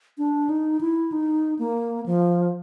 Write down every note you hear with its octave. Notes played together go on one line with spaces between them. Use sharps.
D4
D#4
E4
D#4
A#3
F3